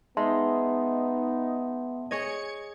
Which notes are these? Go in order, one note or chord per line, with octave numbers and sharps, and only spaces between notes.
G#3 B3 D#4 E5 A5 C6
G#4 C#5 D#5 G#6 C#7